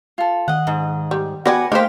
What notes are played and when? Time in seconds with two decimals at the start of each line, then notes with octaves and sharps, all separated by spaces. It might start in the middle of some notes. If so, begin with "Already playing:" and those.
0.18 F4 A4
0.48 D#3 D#5 F#5
0.67 G#2
1.11 G3
1.45 B3 F#4 B4 D5 G5 G#5 A#6
1.72 A3 A#3 D#4 B4 C5 F5 G5 B6